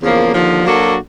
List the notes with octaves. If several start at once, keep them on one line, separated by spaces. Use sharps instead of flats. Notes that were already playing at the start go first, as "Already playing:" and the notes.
E2 C#3 F3 A#3
D#2 D3 F3
F#3 A#3 D4 F#4 A4